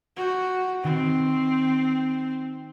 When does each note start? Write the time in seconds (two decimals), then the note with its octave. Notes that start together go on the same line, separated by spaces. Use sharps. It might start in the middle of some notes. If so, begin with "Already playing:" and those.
0.17 F#4 G6 G#6
0.84 D#3 C4